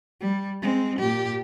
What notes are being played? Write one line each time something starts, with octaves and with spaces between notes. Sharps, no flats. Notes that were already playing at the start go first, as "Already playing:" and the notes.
G3
G#3 C4
A#2 G4